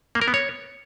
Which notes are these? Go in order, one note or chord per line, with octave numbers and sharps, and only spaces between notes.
A#3
A#4
B3
C#5